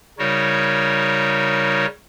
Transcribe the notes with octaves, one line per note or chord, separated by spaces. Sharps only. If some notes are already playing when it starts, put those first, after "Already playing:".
C#3 G3 D#4 F#4 A#4 C#5